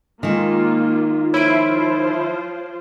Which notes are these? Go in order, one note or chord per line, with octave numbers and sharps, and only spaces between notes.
D#3 G#3 A#3 F4
F3 E4 F4 C5 C#5 D7